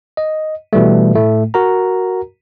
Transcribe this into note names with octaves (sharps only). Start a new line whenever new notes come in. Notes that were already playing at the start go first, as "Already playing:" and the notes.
D#5
B2 E3 G3 A3
A2 A3
F#4 A#4 A#5